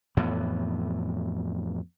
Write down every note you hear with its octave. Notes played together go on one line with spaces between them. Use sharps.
F2 A2 E3 B3